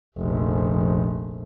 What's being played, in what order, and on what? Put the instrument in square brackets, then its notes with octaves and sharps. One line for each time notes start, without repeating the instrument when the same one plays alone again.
[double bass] F1 A#1